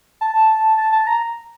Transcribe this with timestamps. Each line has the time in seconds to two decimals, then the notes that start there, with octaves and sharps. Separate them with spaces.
0.21 A5
0.77 A5
0.92 A5
1.07 A#5